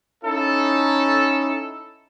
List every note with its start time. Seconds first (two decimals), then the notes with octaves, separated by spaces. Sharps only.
0.23 C#4 D#4 E4 A4